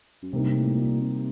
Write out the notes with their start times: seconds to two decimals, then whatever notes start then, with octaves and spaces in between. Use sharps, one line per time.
0.23 F#2
0.33 G2 C3 G3 A#3 D#4
0.55 A2
0.78 A#2
1.01 C3